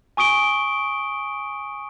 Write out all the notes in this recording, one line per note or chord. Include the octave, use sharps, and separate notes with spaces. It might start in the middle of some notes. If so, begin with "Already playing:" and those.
G#5 C#6 D#6 D7 G7